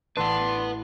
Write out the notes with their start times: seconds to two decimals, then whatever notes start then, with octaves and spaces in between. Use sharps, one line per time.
0.17 A1 D4 B4 F#5 C6 E6